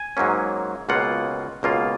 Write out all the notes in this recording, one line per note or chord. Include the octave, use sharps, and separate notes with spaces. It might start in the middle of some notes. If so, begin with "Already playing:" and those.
Already playing: G#5
G#2 F#3 A#3 C#4
C#2 B2 A#3 F4 F#5
C#2 B2 A#3 F4